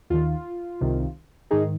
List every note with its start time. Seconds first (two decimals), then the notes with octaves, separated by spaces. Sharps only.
0.10 D#2 D#3 F4
0.81 C2 C3 D#3
1.51 G#2 D#3 D#4 G#4